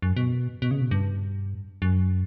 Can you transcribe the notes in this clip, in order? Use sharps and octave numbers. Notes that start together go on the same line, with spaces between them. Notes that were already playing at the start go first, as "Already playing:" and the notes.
F#2
B2
B2
C#3
B2
G2
F#2